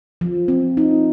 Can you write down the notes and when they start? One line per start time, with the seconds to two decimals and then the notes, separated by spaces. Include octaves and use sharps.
0.21 F3
0.48 C4
0.77 D#4